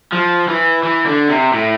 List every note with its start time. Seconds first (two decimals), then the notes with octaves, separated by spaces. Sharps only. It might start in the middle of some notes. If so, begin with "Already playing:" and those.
0.12 F3
0.48 E3
0.83 E3
1.06 D3
1.29 C3
1.53 A2